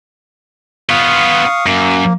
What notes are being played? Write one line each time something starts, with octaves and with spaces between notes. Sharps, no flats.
B3 F4 F5 C#6 D#6
F#2 A#3